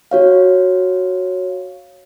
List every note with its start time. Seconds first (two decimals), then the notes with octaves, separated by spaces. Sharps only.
0.11 F#4 C#5 F5